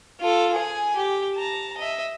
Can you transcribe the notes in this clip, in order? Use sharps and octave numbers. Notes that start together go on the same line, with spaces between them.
F4 A4
G#4 G#5
G4
A5 A#5
D#5 E5